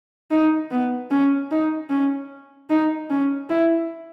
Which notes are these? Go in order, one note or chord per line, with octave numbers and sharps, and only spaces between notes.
D#4
B3
C#4
D#4
C#4
D#4
C#4
E4